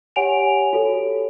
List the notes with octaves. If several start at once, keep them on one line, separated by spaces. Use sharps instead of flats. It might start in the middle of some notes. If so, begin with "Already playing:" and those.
G4 C#5 F#5 G#5 D7 F7
F#4 G4 A4 C#5